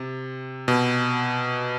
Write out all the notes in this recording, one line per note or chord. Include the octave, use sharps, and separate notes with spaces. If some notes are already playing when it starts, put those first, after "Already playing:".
Already playing: C3
B2